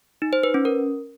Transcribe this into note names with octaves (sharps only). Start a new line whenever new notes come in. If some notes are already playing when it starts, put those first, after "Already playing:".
D#4
C5
B4
C#4
A#4